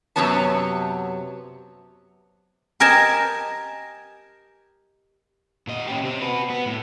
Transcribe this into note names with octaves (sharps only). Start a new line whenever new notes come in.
F#2 C3 F#3 B3 C#5 A5
G4 A#4 D#5 G#5 A5
A#2 D#5
C#4 G4
C3 C4
F#4 B4
B3
A2